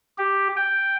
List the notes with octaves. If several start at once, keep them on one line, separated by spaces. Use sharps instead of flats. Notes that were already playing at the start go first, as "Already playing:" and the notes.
G4
G5